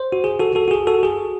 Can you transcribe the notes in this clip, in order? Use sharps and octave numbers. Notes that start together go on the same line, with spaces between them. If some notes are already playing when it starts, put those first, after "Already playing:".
Already playing: C5
F#4
G#4
F#4 A4
F#4 A4
F#4
G#4
F#4 A4
G#4